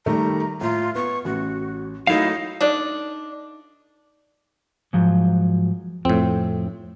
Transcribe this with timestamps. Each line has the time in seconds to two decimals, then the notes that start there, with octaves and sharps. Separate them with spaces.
0.06 D#3 G3 A3 A#5
0.61 A2 F4 A#5
0.95 B3 C#6
1.25 A1 F#4
2.07 F#3 A3 D#4 E4 F5
2.61 A3 D4 D#4 D5
4.93 G#2 F3 F#3
6.05 F2 A2 C4